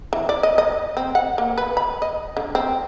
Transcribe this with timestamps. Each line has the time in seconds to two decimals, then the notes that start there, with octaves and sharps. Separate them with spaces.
0.13 E3
0.29 D5
0.43 D#5
0.58 D#5
0.97 C4
1.15 F#5
1.38 A#3
1.58 B4
1.77 B5
2.02 D#5
2.37 D3
2.55 C4